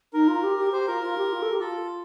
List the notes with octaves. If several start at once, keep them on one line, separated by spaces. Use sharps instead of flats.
D#4 A#4
F4
G4
G4
G4 C5
F4 A#4
F4
G4
F4
A4
G4
F4 A4